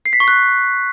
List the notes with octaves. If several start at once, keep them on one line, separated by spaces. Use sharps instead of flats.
C7
B6
C#6
F#6